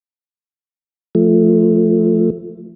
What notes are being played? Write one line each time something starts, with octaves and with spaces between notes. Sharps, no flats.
F3 A3